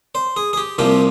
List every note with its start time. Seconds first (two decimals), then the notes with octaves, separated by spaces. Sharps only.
0.15 C5
0.37 G#4
0.53 G#4
0.57 G4
0.78 C2 C3 F3 A#3 G4